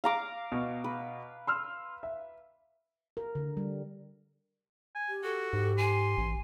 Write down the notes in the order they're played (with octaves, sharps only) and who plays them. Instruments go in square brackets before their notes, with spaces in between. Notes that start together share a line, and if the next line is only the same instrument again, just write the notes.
[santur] F5 A#5 D6
[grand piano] B2
[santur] B4
[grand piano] C6 E6 F6
E5
[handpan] A#4
D3
G3
[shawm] G#5
[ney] G4
[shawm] F#4 [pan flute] A4
[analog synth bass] G#2 [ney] G4
[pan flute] G#5 [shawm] C6
[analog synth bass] A1